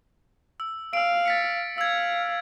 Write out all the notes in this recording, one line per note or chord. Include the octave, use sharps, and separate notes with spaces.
E6
F5 E6 D7
A6 B6 C#7
F5 E6 G#6